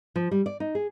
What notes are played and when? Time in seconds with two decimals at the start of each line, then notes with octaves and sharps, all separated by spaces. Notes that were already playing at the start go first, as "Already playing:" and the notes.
0.16 F3
0.31 G3
0.46 D5
0.60 D#4
0.75 G#4